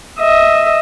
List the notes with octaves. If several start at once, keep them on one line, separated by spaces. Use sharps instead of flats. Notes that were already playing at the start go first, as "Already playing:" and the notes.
D#5 E5